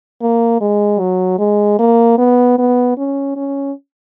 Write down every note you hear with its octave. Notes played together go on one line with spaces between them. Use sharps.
A#3
G#3
F#3
G#3
A#3
B3
B3
C#4
C#4